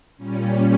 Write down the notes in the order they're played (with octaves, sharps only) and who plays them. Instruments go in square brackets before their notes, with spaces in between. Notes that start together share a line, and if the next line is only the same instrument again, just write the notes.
[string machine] A#2 G3 C#4